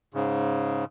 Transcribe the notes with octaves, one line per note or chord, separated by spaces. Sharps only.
G#2 C#3